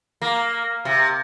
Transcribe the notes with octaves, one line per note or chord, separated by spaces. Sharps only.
A#3
C3